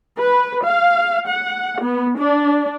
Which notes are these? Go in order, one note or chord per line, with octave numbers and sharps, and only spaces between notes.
B4
F5
F#5
B3
D4